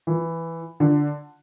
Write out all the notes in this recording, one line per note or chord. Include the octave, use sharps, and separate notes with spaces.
E3
D3